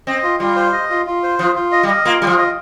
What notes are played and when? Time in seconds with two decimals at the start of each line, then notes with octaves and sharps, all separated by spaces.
0.07 C4 D#5
0.23 F4
0.40 G3 F4
0.56 C5
0.73 D#5
0.90 F4
1.06 F4
1.23 C5
1.39 F3 F4
1.55 F4
1.72 D#5
1.83 G3
1.88 D#5
2.05 A#3 F4
2.22 G3 F4
2.27 F3
2.38 D#5